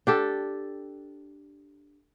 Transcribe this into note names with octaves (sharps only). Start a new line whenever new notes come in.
D4 G4 A4